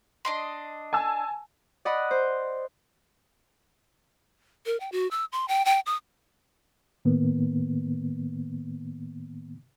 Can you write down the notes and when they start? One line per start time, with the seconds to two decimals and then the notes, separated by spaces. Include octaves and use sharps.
0.25 D4 D#5 C6
0.93 G#5 A5 E6
1.85 D5 D#5 F#5 B5 D#6
2.11 C5
4.66 A#4
4.80 G5
4.92 F#4
5.11 E6
5.32 C6
5.48 G5
5.65 G5
5.86 D#6
7.05 A2 D#3 A#3 B3